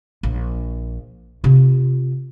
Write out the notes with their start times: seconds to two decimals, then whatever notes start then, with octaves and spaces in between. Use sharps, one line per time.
0.23 A#1
1.44 C3 F4